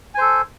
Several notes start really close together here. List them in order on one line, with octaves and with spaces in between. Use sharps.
G#5 C5 A4